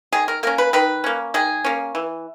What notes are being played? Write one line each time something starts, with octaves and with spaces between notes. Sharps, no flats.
D#3 G#4
A#4
A#3 C#4 A#4
B4
D#3 B4
A#3 C#4
D#3 G#4
A#3 C#4
E3